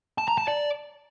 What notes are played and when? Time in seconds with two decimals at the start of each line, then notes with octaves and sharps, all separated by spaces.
0.18 A5
0.28 A#5
0.38 A5
0.48 D5